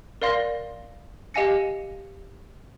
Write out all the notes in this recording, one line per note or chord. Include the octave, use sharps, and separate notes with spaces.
A#4 D5 F5 C6 A#6
G4 D#5 F5 G#5 A#6 C#7